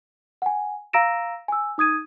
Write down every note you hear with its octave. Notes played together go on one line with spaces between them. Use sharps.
F#5 G#5
F5 A#5 E6 A#6 D7 E7
G#5 E6
D#4 D#6 G#6 D#7